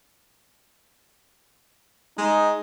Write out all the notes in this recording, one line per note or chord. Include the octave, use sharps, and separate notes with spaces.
G#3 D#4